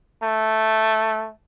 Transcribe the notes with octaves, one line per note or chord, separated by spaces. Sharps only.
A3